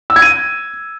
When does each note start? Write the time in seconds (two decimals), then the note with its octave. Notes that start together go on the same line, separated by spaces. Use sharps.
0.10 E6
0.16 G#6
0.22 D#7